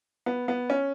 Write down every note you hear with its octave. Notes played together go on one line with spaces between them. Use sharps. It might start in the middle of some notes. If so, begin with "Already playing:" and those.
B3
B3
C#4